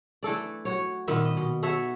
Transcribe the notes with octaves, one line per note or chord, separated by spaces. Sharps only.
E3 A3 A4 D5
F#4 C#5
A#2 D#3 B3 E5
D#5
B2
F#4 A4 C#5 E5